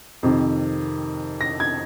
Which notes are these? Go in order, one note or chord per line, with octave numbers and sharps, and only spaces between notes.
F2 C3 D#3
A#6
G#6